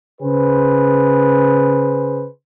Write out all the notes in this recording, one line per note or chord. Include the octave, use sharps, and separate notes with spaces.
C#3 G#4 B4 C5